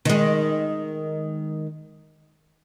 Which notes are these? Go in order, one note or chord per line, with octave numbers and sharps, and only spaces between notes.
D#3 G#3